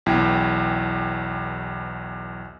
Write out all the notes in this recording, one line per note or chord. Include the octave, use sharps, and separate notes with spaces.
B1 E2 E4 G5